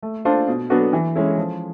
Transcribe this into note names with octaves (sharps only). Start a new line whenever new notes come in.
A3
D4 F4 A4 C5
B2
F#3 B3 D4 F#4
E3
G#3 C#4 E4
F3